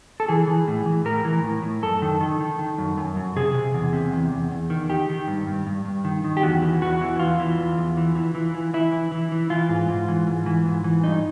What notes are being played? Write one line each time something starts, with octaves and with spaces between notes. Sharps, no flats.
A4
E3 G#4
E3
A2
E3
A2 A#4
E3
A2
A2
F#2 A4
D#3
D#3
D#3
D#3
F#2
F#2
F#2
C3 G#4
C3
E2
C3
E2
E2
E2
D#3
D#3 G4
D#3
G2
G2
G2
G2
D#3
D#3
G4
E2 F#4
E3
E2 F#4
E3
E2 F4
E3
E2
E2
E3
E3
E3
E3
E3 E4
E3
E3
E3
E3 F4
G#2
G#2
E3
G#2
E3
G#2
E3
G2 D#4